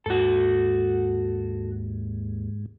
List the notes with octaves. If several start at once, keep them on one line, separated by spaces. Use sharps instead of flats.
D#2 G#2 F#4 A4